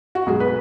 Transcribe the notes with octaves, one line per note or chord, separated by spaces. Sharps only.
F#4
B1 B2 G#3 G#4
B4